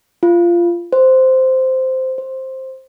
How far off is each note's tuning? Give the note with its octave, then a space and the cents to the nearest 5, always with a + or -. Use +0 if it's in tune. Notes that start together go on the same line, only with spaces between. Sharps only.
F4 -15
C5 -5
C5 +10